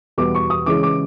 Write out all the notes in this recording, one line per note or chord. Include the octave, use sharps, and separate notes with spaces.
E2 B2 G3 B3 D6
C#6
D#6
C#3 E3 G#3 C#4 D6
D6